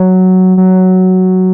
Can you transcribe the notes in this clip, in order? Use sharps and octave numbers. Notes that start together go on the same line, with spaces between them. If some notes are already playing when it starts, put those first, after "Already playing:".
Already playing: F#3
F#3